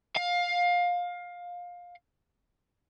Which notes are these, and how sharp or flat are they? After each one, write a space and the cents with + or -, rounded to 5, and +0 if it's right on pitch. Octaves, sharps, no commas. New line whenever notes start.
F5 +20